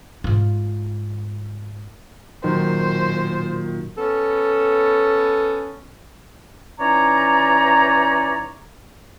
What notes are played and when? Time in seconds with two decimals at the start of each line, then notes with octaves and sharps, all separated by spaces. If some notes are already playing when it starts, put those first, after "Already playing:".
0.24 G#2 F4
2.44 A#2 D#3 F#3 C5
3.98 B3 C#4 A4
6.79 E3 C#4 D#4 C#5 D5 A#5